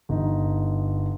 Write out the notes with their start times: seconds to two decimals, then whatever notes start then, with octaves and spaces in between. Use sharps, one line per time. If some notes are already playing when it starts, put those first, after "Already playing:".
0.09 G1 D#4